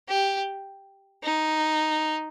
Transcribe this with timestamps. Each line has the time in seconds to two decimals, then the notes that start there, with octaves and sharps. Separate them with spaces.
0.09 G4
1.24 D#4